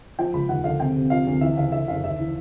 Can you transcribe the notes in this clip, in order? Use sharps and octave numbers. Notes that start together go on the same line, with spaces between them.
F3 G5
C#2 B5
D#2 F#5
D3 F5
C3 G5
C3
F3 F5
D2
E3 E5
C#3 F5
D3 E5
F#1 F5
D#2 E5
E3